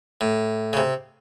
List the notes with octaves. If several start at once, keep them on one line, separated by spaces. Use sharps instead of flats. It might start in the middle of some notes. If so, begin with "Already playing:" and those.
A2
C#3
C3